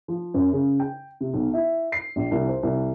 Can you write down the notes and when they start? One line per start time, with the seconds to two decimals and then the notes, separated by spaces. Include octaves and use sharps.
0.08 F3
0.34 F#2
0.53 C#3
0.79 G5
1.21 C3
1.33 B1
1.53 E4
1.92 C7
2.16 A#1
2.31 C2
2.48 C5
2.63 C2